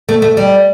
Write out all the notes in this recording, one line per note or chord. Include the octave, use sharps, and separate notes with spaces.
A3
A3
G3